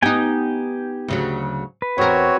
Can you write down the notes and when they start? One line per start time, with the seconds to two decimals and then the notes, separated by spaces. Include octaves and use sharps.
0.02 B3 D#4 G4 G5 G#5
1.08 D2 C#3 F#3
1.82 B4
1.98 E2 C4 F#4 A#4 C#5